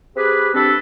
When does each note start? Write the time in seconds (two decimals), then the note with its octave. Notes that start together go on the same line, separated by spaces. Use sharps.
0.16 C4 G4 G#4 B4
0.54 G3 C4 D4 A4 B4